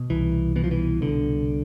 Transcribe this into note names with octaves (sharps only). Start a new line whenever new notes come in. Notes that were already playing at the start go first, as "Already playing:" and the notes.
Already playing: B2
C2 E3
B2 E3
F3
E3
C2 D3